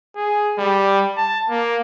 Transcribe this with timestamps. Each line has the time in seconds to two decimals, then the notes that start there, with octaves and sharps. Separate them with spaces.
0.16 G#4
0.58 G3
1.17 A5
1.50 A#3